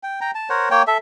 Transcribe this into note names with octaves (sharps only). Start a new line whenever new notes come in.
G5
G5 A#5
A5
A#4 C5 C#5 F#5
A#3 C#5 G5
A4 E5